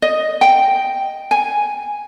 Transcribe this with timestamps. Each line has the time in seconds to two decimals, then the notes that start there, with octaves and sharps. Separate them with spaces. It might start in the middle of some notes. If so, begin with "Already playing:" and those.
0.02 D#5
0.41 G5
1.31 G#5